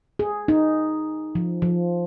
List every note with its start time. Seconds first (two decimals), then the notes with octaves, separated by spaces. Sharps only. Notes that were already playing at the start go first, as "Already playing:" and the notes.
0.19 G#4
0.48 D#4
1.35 F3
1.62 F3